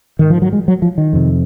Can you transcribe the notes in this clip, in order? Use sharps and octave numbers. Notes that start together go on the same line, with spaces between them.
G#2 D#3
F3
F#3
G#3
F#3
F3
D#3
F2 C3